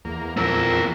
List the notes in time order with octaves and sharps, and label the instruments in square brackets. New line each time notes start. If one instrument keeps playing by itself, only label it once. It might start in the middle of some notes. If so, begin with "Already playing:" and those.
[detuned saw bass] E2 [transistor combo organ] A#3
[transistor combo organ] F2 A#2 E6 [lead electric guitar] C4 A#4